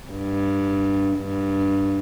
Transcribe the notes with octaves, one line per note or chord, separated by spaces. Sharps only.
G2
G2